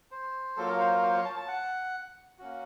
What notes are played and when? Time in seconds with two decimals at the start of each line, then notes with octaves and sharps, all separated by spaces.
0.11 C5
0.57 F#3 A#3 F4 A4
0.68 A#4
0.79 C5
0.91 A#4
1.02 C5
1.14 C#5
1.25 A5
1.36 A5
1.48 F#5
2.39 A#3 C#4 F#4